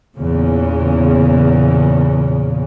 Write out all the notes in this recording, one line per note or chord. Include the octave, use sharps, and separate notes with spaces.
E2 A#2 C#3